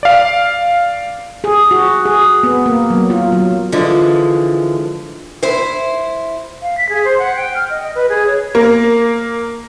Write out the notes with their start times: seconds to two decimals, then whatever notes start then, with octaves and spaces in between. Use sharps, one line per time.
0.03 D5 F5
1.44 G#4
1.71 F#4
2.06 G#4
2.43 B3
2.66 A#3
2.90 F#3
3.10 F4
3.32 F#3
3.72 D3 E3 F3 G#3
5.43 E4 C5
6.62 F5
6.78 B6
6.89 G#4
7.05 C5
7.19 F#5
7.36 G5
7.55 F6
7.70 D#5
7.83 D#5
7.95 B4
8.09 G#4
8.27 C#5
8.55 A#3